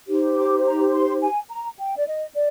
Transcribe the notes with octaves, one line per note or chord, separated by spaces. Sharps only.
D#4 G4 C5
D6
A#5
C6
G#5
A#5
G5
D5
D#5
D5